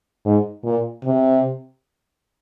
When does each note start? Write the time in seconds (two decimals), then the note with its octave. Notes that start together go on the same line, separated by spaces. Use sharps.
0.25 G#2
0.64 A#2
1.05 C3